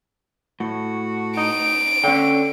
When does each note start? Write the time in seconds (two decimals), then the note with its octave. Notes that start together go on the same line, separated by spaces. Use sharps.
0.60 A2 F#4
1.37 D#4 D7
2.04 D3 C#4 G5